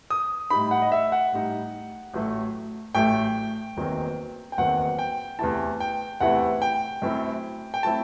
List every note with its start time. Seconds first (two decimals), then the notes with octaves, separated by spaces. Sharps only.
0.10 D#6
0.50 A2 G3 D#4 B5
0.71 F#5
0.82 D#5
0.92 E5
1.12 F#5
1.32 A2 G3 D#4
2.13 A1 A2 F#3 A3
2.95 A1 A2 F#3 A3 G5
3.77 F#1 E2 D#3 F#3 C4
4.52 G5
4.57 F#1 E2 D#3 F#3 C4 F#5
4.99 G5
5.39 E2 C3 E3 A3 E4 A5
5.80 G5
6.20 E2 C3 E3 A3 E4 F#5
6.62 G5
7.02 F#2 F#3 A3 C4 E4
7.74 G5
7.83 F#3 A3 C4 E4 A5